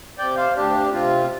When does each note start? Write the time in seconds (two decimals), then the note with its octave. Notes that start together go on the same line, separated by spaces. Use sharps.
0.18 C3 D5 G5
0.37 C5 F5
0.56 D2 D4 G4
0.93 C3 C4 F4